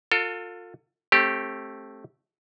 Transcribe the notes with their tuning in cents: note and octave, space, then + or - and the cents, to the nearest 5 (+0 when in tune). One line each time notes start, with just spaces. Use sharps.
F4 +30 A4 +35
A3 +0 C4 +35 G4 +0